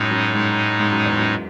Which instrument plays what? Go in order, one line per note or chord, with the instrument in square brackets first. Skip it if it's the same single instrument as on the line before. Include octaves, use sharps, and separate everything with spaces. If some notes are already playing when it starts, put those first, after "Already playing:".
Already playing: [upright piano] F#2 [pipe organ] A2 G#3 D#4
[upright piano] F#2
G#2
G#2
F#2
E2
F#2